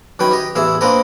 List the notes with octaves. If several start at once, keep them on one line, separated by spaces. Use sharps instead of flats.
F#2 D#3 C#4 B4 G5
G4 D#5
A1 E2 E3 G#4 E5
A#3 C4 D4 A#4 B4 D#5